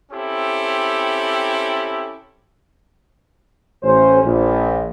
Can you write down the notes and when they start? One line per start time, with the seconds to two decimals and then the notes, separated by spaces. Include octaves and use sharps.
0.12 C4 C#4 E4 G4 A4
3.83 A1 C#4 C5
4.24 A#1